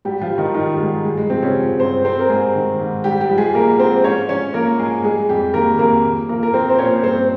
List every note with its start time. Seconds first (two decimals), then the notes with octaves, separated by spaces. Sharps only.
0.05 G#2 G3 G4
0.21 F3 F4
0.30 G3
0.38 D#3 D#4
0.55 D#3 G3 D#4
0.74 G3
0.80 G#2 G#3
1.05 G2 G#3
1.17 G#3
1.30 C3 F3 C4
1.42 C#3 C#4
1.55 F3
1.79 G2 C4 C5
2.05 G3 C4 C5
2.19 A#4
2.29 G#2 G#3 G#4
2.55 D#3
2.80 G#2
3.04 G#2 G3 G4
3.21 G3 G4
3.30 F3
3.38 G#3 G#4
3.54 F3 A#3 A#4
3.79 G#2 C4 C5
4.04 G#2 C#4 C#5
4.29 F3 C#4 C#5
4.54 F3 A#3 A#4
4.79 G#2 G#3 G#4
5.04 G3 G#3 G#4
5.29 F2 G3 G4
5.54 D#3 A#3 A#4
5.79 F2 A#3 A#4
6.04 A#2
6.29 F3 A#3 A#4
6.43 A#4
6.54 F3 C4 C5
6.70 C5
6.79 A#2 C#4 C#5
7.04 G2 C4 C5